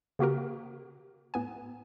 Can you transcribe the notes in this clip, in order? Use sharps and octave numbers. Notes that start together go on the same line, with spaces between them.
C#3 A#3 F#4 G4 A#4
A2 B3 G#5